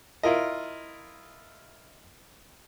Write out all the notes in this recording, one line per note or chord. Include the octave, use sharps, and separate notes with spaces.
E4 F4 A#4 D#5